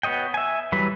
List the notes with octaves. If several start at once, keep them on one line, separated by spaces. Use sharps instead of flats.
B3 F#4 C#5 D#5 G5
E5 G#5
E3 F#3 G3 B4